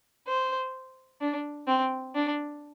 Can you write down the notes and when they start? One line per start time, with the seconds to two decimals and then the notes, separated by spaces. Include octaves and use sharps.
0.27 C5
1.21 D4
1.67 C4
2.15 D4